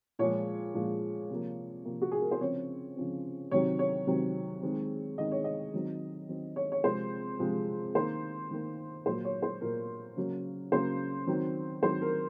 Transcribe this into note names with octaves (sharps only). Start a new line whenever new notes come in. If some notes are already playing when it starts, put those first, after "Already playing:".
A#2 F3 G#3 C#5
A#2 F3 G#3
C3 F3 A#3
C3 F3 A#3
F#4
G#4
A#4
C5
C#3 F3 C4 C#5
C#3 F3 C4
C3 D#3 F#3 C4 C#5
C#5
C3 D#3 F#3 C4
D#3 G#3 C4
D#3 G#3 C4 D#5
C#5
D#5
D#3 F#3 C4
D#3 F#3 C4
C#5
C#5
C3 F3 G#3 C4 C5
C3 F3 G#3 C4
D#3 A#3 C5
D#3 A#3
A#2 F#3 A#3 C5
C#5
C5
A#2 F#3 A#3 A#4
C#3 F#3 A#3
C#3 F#3 A#3 C5
D#3 F#3 C4
D#3 F#3 C4 C5
A#4